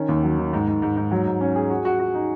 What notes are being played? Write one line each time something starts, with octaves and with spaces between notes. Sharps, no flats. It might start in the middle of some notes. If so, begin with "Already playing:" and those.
Already playing: D#3 C#4
D#2
F#3
D#3
G#2
G#2
G#2
G#2
F#3
G#2
C#4
G#4
F#4
F#4
F#4
D#4